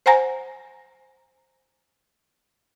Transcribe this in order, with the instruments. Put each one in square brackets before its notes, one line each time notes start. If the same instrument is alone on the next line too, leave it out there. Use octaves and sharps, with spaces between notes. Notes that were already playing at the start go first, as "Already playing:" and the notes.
[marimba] C5 F#5 G#5 A#5 A#6